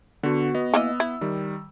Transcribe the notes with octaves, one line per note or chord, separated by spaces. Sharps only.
D3 B3 F#4
B3 D#5
E3 A#3 D#5 E6
E4
D#3 G3